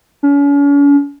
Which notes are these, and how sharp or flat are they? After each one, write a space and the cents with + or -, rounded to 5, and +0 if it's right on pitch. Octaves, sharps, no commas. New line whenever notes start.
C#4 +40